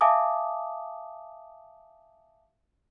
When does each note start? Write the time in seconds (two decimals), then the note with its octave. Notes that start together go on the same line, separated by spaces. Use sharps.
0.01 E5 F5 G#5 A5 D6 D#6